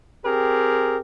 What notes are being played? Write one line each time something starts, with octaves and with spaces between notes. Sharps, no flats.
C4 G4 G#4 A#4